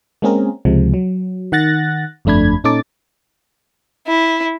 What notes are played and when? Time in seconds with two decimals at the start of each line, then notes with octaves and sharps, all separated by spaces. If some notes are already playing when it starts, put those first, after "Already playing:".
0.22 G#3 A#3 C4 C#4 G#4 A#4
0.65 C#2 C3 F3 G#3
0.94 F#3
1.52 D#3 F#5 F#6 A6 A#6
2.25 G1 F2 A3 D4 B5 G#6
2.64 A#2 C#4 D#4 A4 D6 A6
4.07 E4